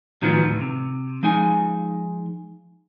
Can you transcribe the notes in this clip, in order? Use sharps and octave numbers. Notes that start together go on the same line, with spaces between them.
A2 D#3 F3 F#3 B3
D2 A2
C3
F3 G#3 D#4 G#5